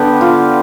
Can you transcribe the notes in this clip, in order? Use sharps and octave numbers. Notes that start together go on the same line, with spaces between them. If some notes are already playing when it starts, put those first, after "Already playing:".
Already playing: D3 B3 G4
F4